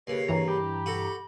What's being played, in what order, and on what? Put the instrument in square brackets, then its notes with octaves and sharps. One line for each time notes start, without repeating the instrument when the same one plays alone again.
[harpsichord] D#2 C#3 [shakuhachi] B4 [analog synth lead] C7
[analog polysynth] G2 E3 A#5 [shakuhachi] C#5
[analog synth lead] G4 [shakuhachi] B5
[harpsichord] F#4 A4